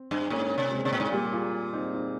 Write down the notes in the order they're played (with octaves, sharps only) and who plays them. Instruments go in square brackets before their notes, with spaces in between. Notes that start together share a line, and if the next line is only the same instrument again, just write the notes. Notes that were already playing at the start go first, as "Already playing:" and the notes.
Already playing: [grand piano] C4
[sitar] G2
[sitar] G#2 [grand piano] A#3 C#4
[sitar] C3
[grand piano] G#3 C4
[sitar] C3
A#2
G#2
A#2
[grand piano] G3 A#3
F4 G#4
C4 D#4
C4 D#4